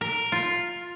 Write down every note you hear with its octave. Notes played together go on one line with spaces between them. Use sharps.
A#4
F4